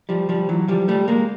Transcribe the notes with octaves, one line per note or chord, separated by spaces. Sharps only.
F3 G3
F3 G3
E3 F#3
F3 G3
G3 A3
G#3 A#3